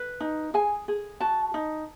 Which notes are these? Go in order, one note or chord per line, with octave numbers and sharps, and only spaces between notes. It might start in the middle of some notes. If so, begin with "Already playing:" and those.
Already playing: B4
D#4
G#4 G#5
G#4
F#4 A5
D#4